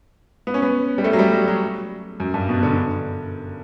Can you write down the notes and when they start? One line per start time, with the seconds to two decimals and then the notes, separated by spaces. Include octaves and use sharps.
0.47 B3
0.54 C#4
0.62 B3
0.98 G3
1.04 A3
1.13 F#3
1.19 G3
1.33 F#3
1.48 F#3
2.20 F#2
2.34 G2
2.49 B2
2.63 D3
2.77 D3